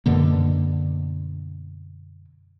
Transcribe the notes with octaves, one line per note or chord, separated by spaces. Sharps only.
F#2 B2 D3 A#3